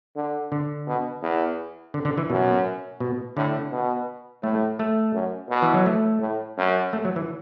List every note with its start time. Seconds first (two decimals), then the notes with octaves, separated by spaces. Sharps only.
0.16 D3
0.52 D3
0.87 B2
1.22 E2
1.94 D3
2.05 D3
2.17 E3
2.30 F#2 B2
3.00 B2
3.36 A2 D3
3.72 B2
4.43 A2 A3
4.79 A3
5.14 F#2
5.50 B2
5.62 E3
5.74 F#3
5.86 A3
6.21 A2
6.57 F#2
6.93 A3
7.05 F#3
7.16 E3